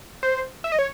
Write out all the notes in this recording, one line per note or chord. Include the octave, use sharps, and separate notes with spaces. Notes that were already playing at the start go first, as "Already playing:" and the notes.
C5
E5
D#5
C#5